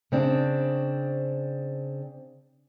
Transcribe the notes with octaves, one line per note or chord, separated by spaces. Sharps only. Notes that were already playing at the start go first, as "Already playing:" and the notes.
C#3 C4 D4